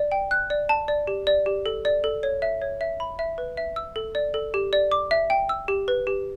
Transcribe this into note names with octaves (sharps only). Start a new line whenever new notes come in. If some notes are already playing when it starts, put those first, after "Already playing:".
Already playing: D5
G5
F#6
D5
A5
D5
G4
D5
G4
A4
D5
A4
C#5
E5
C#5
E5
B5
E5
B4
E5
E6
A4
D5
A4
G4
D5
D6
E5
G5
E6
G4
B4
G4